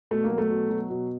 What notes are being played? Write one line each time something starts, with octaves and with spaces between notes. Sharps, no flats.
B2 A3
A#3
F#3
A3
B2
F#3
B2